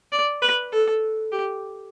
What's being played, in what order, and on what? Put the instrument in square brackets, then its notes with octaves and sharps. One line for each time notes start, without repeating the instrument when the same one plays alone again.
[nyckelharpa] D5
B4
A4
G4